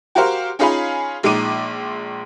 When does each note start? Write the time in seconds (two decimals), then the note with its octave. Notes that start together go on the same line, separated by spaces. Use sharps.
0.15 F#4 G4 A#4 C5 F5
0.59 C#4 D#4 F4 G#4 F5 B5
1.23 A#1 G#3 D#4 D6 D#7